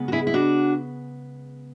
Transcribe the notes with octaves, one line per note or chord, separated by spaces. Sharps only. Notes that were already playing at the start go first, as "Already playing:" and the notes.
Already playing: C#3 G#3 B3
F#4
E4 G#4
E4
D4 F#4